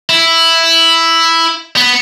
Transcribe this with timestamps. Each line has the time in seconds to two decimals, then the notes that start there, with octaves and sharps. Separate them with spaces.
0.09 E4
1.77 B3